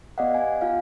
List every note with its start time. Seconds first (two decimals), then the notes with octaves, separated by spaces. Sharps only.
0.18 B3 G4 D5 D#5 F5 F#5
0.35 G#5
0.61 F4 F5